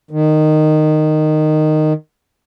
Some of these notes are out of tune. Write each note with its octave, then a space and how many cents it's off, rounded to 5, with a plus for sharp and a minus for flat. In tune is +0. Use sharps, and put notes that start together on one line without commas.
D#3 -15